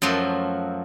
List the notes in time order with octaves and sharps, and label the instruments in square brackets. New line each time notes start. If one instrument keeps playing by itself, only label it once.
[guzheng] F#2 F3 F#3 A3 C6